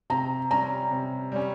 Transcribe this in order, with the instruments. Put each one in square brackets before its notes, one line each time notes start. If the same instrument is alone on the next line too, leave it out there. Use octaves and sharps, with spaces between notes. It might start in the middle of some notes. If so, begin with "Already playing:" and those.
[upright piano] C3 [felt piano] A#5
[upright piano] G3 C#4 [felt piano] A#5
[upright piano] C3
G3 C#4